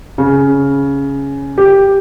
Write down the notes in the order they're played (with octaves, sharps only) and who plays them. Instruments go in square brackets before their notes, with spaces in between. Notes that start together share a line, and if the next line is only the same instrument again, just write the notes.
[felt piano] C#3
G4